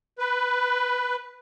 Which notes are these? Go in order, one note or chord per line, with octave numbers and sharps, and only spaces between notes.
B4